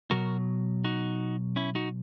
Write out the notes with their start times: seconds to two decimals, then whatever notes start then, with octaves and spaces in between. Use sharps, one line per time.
0.11 B2 F#3 F#4 A#4
0.84 D#4 F#4
1.56 C#4 E4
1.75 D#4 F#4